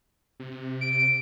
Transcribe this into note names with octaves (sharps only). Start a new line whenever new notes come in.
C3
D7